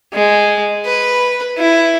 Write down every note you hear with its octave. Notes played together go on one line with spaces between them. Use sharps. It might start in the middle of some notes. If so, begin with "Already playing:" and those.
G#3
B4
E4